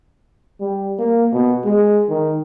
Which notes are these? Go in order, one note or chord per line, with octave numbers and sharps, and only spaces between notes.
G3
A#3
B2
G#3
D#3